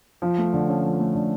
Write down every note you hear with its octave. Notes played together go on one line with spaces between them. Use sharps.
F3
A3
D3
C#4
F3
A3
D3